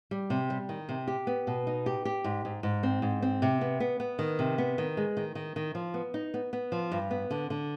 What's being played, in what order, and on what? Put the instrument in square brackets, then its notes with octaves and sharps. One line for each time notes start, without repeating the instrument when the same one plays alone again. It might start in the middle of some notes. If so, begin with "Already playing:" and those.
[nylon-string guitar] G3
C3
G3
D#3
C3
G4
B3
B2
D#4
G4
G4
G#2
G#2
G#2
C4
G#2
C4
C3
B3
B3
B3
D#3
C3
B3
D#3
G#3
D#3
D#3
D#3
F3
B3
D#4
B3
B3
F3
G2
B3
D3
D3